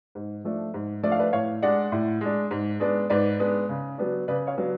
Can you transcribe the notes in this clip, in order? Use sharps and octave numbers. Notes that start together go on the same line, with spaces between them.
G#2
F3 A3 D4
G#2
F3 A3 D4 D5
F5
B4 D5
A2 C#5 F5
G#3 D4 D5 F#5
A2
G#3 D4
G#2
G#3 B3 D4
G#2 B4 D5
G#3 B3 D4
C#3
F#3 B3 D4
C#3 B4 D5
C#5 F5
F#3 B3 D4